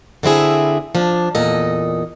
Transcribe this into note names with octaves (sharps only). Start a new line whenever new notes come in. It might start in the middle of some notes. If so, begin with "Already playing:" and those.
D3 C4 E4 G#4
F3 D4
E2 A#2 A4 D#5